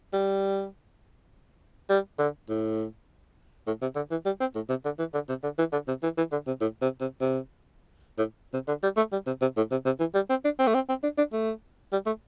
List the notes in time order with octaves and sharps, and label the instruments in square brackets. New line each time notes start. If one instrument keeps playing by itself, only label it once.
[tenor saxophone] G3
G3
D3
A2
A2
C3
D3
E3
G3
C4
A2
C3
D3
E3
D3
C3
D3
E3
D3
C3
E3
E3
D3
C3
A2
C3
C3
C3
A2
C3
D3
G3
A3
G3
C3
C3
A2
C3
C3
E3
G3
C4
D4
C4
A3
C4
C4
D4
D4
A3
G3
A3